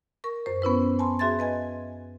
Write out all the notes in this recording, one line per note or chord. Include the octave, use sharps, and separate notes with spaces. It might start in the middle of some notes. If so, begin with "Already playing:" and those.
A#4 C#6
F#2 C5
B3 C#4 E4 B4
G#5 A5 B5 C6
F#4 G#4 E5 C6 G#6 A6
B4 D#5 G#5 G#6